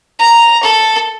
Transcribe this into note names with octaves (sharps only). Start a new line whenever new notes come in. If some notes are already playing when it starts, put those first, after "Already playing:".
A#5
A4